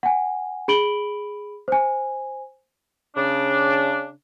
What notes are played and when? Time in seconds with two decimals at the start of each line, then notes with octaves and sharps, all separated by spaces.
0.03 F#5 G#5
0.68 G#4 B5 D7 F#7 G7
1.68 C5 G#5
3.17 C#3 D4